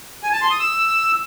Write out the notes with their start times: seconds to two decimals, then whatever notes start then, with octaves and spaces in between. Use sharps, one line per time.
0.23 G#5
0.32 A5
0.42 C6
0.51 D#6
0.60 E6